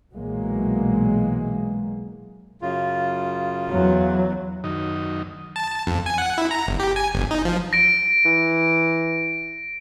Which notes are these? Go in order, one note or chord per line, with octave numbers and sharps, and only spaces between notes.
B1 A#2 E3 F#3 G#3 A#3
F#2 C#3 F4
E2 F#3
F#2 D#3 D#4
A5
F2
G#5
F#5
E4
A#5
G1
G4
G#5
G1
D#4
F3
A#6 D7
E3